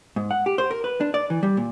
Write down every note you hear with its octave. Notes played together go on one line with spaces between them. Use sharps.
G#2
F#5
G4
C5
A#4
B4
D4
D5
E3
G3
A#2